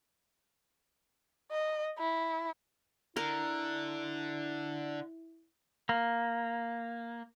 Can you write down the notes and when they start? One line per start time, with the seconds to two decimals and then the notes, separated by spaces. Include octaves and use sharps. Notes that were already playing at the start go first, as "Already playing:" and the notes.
1.51 D#5
1.98 E4
3.17 D3 E4 A#4
5.89 A#3